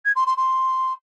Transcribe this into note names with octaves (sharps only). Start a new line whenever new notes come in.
G#6
C6
C6
C6